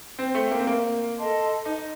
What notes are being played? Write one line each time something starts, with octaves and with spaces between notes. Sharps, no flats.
C4 C5 G5 C6
A3
A#3
C4
A#3
A4 D#5 A5 C6
D#4